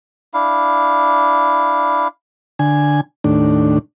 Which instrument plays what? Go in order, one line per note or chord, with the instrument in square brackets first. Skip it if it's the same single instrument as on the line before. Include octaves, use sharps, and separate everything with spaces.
[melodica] D4 E4 F5
[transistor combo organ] D3 G#5
D#2 A2 D4